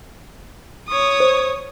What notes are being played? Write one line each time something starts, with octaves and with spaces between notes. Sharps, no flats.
C#5 D#6
C5